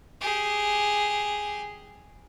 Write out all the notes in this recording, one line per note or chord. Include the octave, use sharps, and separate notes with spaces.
G4 G#4